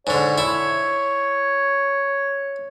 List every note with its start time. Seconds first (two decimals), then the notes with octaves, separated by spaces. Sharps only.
0.07 G#2 D3 C#5
0.38 E4